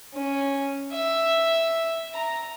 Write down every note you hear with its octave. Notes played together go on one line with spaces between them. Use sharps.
C#4
E5
A#5